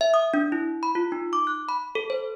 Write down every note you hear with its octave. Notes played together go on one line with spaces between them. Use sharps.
E5
D#6
D4
E4
B5
F4
D#4
D6
F#6
B5
A4
C5